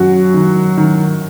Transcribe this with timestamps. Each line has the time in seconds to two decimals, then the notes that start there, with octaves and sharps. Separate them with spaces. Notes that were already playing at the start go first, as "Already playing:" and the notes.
Already playing: F#2 D#3 F#3 F#4
0.34 D#3
0.77 D#3